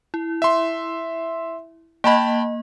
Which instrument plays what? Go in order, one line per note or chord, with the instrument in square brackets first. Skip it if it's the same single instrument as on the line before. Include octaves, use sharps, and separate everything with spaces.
[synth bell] E4
[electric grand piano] E5 C6
[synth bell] A#3 D#5 [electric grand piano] G5 A5 B5